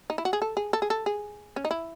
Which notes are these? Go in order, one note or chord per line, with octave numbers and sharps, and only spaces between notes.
D#4
E4
F#4
G#4
A4
G#4
A4
G#4
A4
G#4
C#4
D#4
E4